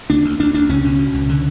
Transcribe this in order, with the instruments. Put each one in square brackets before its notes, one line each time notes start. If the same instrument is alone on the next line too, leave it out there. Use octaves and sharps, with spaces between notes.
[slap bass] D2 D4
D2
D2 D4
D2 D4
C#2 C#4
B2
B2
C#2
D3